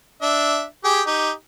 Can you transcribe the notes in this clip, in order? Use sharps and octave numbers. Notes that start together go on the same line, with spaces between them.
D4 E5
G4 G#4 G5
D#4 G4